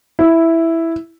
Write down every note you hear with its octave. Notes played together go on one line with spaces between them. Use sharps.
E4